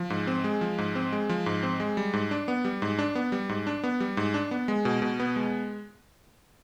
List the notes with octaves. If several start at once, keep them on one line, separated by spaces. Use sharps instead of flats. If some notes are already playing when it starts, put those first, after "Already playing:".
Already playing: F3
G#2
C4
G#3
F3
G#2
C4
G#3
F3
G#2
C4
G#3
G3
G#2
D4
B3
G3
G#2
D4
B3
G3
G#2
D4
B3
G3
G#2
D4
B3
G#3
B2
B2
B3
G#3